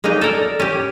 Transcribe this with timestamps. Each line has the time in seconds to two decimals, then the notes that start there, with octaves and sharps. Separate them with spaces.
0.04 G#3 A#3 C#4 D#4
0.21 A4 A#4 D5
0.60 C#4 G4